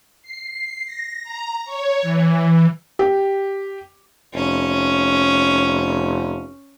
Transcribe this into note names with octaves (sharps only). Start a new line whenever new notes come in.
C7
A#6
A#5
C#5
E3
G4
F1 C#4